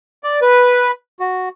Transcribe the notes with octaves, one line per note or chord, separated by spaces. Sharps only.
D5
B4
F#4